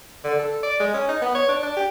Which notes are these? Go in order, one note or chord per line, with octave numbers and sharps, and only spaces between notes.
D3
A4
D5
G#3
C#4
D#4
B3
C#5
D4
D4
G4